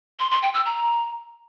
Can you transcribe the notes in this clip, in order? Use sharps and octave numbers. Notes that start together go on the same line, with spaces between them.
C6
C6
G5
E6
A#5